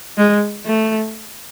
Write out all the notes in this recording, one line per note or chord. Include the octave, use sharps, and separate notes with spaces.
G#3
A3